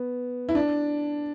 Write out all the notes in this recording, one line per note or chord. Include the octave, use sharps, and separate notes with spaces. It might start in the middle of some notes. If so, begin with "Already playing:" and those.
Already playing: B3
E4
D4